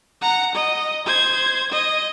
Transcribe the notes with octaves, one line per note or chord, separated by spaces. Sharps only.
F#5 A#5
D#5
C5 G#6
D#5